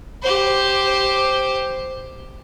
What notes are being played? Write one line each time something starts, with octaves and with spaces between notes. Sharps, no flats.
G4 C5